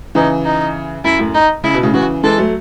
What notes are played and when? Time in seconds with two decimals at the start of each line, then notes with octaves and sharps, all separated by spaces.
0.15 C#3 E3 D#4
0.45 D#4
1.04 F#2 E4
1.19 F#2 A2
1.34 D#4
1.64 C#3 E4
1.74 B2
1.83 A2 C#3
1.94 C#3 E3 F#4
2.24 E3 G#3 A4
2.38 F#3 A3